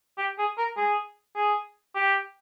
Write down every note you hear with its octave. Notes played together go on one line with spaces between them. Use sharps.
G4
G#4
A#4
G#4
G#4
G4